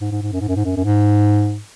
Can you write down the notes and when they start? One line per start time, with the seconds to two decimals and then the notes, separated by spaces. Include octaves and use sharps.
0.01 G#2
0.12 G#2
0.22 G#2
0.33 F#2
0.41 G#2
0.48 F#2
0.56 G#2
0.65 F#2
0.77 F#2
0.85 G#2